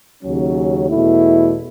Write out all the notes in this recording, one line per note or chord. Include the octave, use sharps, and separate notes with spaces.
D#2 C#3 F#3 C#4
E2 B2 A3 E4